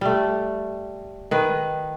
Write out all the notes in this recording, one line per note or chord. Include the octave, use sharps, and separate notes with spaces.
G3 A3
D#3 B4